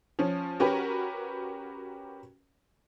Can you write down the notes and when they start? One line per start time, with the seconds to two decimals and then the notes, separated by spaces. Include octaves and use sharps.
0.19 F3 C#4
0.60 C#4 F#4 G4 A#4 B4